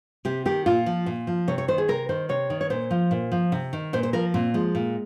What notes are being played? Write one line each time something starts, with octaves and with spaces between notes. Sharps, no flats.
C3 G4
D#3 G4
A#2 F4
F3
A#2
F3
C3 C#5
C#5
D#3 C5
G#4
C3 A#4
D#3 C5
C3 C#5
D#3
C#5
A#2 C5
F3
A#2
F3
C3
D#3
A#2 C5
C5
F3 A#4
A#2 C4
F3 G#3
A#2